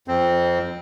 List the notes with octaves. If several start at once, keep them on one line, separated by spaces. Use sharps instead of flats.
F2 C4